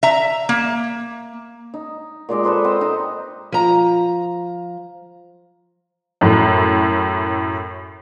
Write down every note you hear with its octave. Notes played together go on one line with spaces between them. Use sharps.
E5 A#5
A#3
D#4
A#2 G#3 D5 D#5
A4 B4 C5 D#5
C4
D#4
F3 A#5
F#2 A2